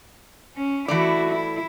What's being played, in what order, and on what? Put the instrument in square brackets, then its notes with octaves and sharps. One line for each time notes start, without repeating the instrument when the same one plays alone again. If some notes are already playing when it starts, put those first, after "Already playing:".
[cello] C#4
[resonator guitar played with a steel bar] E3 A3 D5 [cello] E4 F#4
[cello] E4